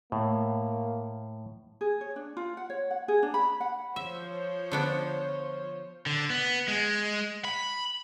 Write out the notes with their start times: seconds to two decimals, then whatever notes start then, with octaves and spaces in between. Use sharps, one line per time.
0.12 A2 A#3
1.81 G#4
2.01 C#5
2.16 D4
2.37 F4
2.57 F#5
2.70 C#5
2.91 F#5
3.08 G#4
3.23 D4
3.34 B5
3.60 F#5
3.96 F3 C5 C#5 E5
4.72 D3 B3 D4
6.06 D3
6.30 B3
6.68 G#3
7.45 B5